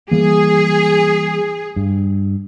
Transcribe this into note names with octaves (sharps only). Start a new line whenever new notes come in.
E3 G3 A#3 G#4
G2